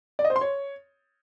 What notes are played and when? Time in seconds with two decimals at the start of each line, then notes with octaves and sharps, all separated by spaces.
0.19 D5
0.25 D#5
0.30 C5
0.36 C6
0.41 C#5